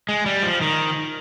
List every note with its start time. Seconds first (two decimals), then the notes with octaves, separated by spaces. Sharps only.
0.09 G#3
0.26 G3
0.43 F3
0.61 D#3